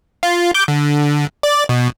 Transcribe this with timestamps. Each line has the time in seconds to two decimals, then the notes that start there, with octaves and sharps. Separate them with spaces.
0.23 F4
0.54 D6 G6
0.68 D3
1.43 D5
1.69 B2